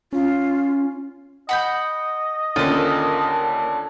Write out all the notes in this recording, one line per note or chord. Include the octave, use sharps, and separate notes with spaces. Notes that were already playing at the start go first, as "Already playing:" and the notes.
C#4 F4
D#5 F#5 B5 G6
D#2 D3 C#4 F4 A4 A#4